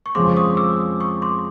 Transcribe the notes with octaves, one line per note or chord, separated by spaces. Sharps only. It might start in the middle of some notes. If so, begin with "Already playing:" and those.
C#6
F2 C#3 F3 G#3 C4 C6 D6
C#6 D#6
D6 E6
C#6 D#6
C6 D6